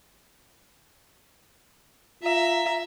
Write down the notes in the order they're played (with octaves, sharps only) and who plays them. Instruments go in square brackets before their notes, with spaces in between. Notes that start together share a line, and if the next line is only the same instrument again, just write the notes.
[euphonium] F4 [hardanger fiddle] E5 A#5